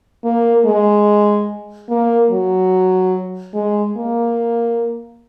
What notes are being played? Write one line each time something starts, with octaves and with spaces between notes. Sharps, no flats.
A#3
G#3
A#3
F#3
G#3
A#3